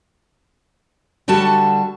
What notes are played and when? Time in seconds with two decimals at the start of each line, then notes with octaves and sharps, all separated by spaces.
1.28 D3 G3 F#4 A4 A5